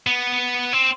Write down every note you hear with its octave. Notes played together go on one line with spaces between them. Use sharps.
B3
C4